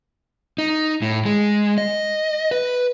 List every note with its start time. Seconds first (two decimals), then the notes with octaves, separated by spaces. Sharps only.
0.58 D#4
1.02 A2
1.25 G#3
1.78 D#5
2.51 B4